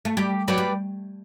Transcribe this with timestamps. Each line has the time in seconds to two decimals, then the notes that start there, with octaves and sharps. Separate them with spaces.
0.05 A3
0.17 G3 G4
0.48 F#3 B4 D5 G5
0.58 G3